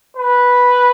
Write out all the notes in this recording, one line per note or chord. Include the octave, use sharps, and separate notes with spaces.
B4